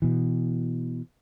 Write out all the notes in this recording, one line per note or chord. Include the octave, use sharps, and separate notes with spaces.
B2 E3